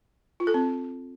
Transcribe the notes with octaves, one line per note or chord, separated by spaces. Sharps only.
F4
A4
C4